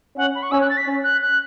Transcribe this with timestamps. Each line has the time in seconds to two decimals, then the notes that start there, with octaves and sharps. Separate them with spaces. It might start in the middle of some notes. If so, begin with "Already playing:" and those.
0.17 C#4 F#5
0.35 B5
0.43 C#6
0.51 C#4 E6
0.61 F#6
0.69 A6
0.77 B6
0.86 C#4
1.04 F#6
1.21 F#6